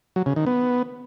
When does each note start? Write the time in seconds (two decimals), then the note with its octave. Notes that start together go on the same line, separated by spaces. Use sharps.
0.16 F#3
0.26 C#3
0.36 D#3
0.47 B3